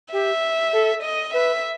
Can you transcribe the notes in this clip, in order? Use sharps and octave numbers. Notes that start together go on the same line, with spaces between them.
G4 E5
A4
D#5
B4 E5